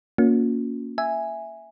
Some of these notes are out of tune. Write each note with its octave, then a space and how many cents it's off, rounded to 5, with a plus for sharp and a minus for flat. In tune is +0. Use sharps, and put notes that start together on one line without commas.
A#3 +0 C#4 +15 F4 +45
E5 +0 G#5 -5